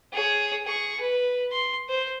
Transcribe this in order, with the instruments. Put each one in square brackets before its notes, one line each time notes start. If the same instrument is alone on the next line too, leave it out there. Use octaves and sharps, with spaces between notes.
[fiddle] G#4 C#5
G#4 C#6
B4
C6
C5